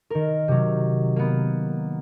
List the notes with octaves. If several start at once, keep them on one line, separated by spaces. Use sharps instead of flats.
D#3 A#4
C3 F#3
A#3 B3